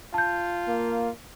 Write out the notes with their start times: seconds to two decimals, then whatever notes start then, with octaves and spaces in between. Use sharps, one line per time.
0.14 F4 A5 G6
0.68 A#3